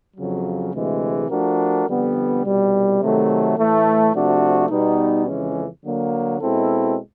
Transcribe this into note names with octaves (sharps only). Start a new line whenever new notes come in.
F2 C#3 F#3
D2 C3 E3 G#3
F3 A3 D4 F#4 A#4
F2 D3 G3 B3
C2 B2 G3
C3 D#3 F#3 A3
A2 E3 A3
C3 F3 A3 D4 F#4
B2 G3 B3 D#4
F2 C#3 E3 G#3 C#4
D3 F#3 A#3
B2 G#3 C4 E4 A4